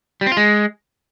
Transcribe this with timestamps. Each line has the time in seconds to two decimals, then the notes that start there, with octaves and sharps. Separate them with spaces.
0.21 G3
0.26 C4
0.32 F4
0.37 G#3